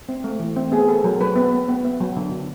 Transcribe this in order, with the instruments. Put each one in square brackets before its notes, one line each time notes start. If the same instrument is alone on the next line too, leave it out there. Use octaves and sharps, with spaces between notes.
[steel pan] C4
A3
E3
C4
B3 G#4
B3 A4
F#3 A#4
F#3 B4
B3
B3
B3
B3
F#3
D3
D3